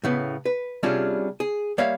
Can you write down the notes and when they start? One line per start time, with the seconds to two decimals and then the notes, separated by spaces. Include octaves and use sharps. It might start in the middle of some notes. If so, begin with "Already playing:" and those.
0.04 A2 C#3 B3
0.46 B4
0.83 C3 G3 C#4 D4 F4 G#4
1.40 G#4
1.78 G3 A#3 C#5 E5 F5